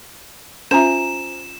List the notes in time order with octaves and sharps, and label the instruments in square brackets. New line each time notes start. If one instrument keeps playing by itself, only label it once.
[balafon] C#4 F4 E5 [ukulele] C5 G#5 A#5 [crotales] E7